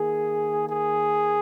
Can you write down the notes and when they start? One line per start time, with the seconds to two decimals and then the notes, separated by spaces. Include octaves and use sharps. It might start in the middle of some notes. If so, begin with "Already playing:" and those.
Already playing: D#3 A#3 G#4
0.67 G#4